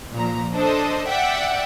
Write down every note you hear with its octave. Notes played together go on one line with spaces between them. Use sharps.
A#2 F3 A#5
D4 A4 C5 D#5
D5 E5 F#5 G5